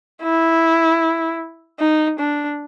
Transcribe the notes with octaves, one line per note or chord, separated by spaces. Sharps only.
E4
D#4
D4